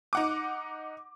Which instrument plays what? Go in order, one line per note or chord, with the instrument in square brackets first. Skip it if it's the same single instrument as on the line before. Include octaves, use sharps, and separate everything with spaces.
[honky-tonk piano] D#4 F#5 D6